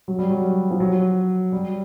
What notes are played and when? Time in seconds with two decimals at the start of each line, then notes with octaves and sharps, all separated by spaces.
0.08 F#3
0.19 G3
0.30 F#3
0.71 F3
0.80 F#3
1.52 G3